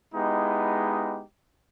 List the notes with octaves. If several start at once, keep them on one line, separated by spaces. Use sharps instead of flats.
G#3 B3 D#4 E4 G4